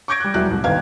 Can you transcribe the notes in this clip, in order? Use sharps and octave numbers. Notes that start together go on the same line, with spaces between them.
C#6 D6 G6 G#6 A#6 D7
G3 F#6
E1 F#3 G3 E4 F#6
C2 A2
G1 D#3 B4 F5 G#6